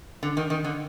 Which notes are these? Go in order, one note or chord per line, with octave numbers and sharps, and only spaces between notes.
D3
D#3
D#3
D3